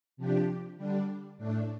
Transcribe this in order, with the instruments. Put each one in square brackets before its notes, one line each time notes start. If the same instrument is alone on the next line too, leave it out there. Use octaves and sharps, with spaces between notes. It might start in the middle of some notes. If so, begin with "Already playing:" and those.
[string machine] C3 F3 D4 G4
D3 G3 D4
A2 A3 D4